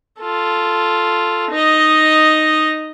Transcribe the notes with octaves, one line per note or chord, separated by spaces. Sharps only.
F4 A4
D#4 D#5